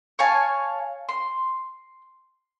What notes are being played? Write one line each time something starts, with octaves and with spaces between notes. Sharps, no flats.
C#5 F5 G#5 A5
C6